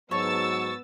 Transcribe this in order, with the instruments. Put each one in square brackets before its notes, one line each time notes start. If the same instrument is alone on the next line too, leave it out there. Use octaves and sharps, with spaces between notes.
[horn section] G#2 F#3 [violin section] B3 E6 A6 [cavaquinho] C#5 A5 [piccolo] C#6